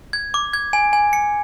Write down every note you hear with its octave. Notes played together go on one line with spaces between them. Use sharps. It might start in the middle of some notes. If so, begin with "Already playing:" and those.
G#6
D6
G#6
G#5
G#5
C#7